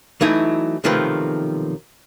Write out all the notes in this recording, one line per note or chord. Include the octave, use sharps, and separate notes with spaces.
E3 F#3 A3 D#4 E4
B1 C3 D#3 F3 A3 B4